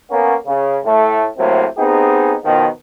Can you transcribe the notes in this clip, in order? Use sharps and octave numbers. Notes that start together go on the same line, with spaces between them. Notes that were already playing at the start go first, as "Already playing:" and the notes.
A#3 B3 C#4
C#3
A2 A3
A2 C3 F#3 A3 A#3 C4
B3 C4 D#4 G4 G#4
B2 D#3 F3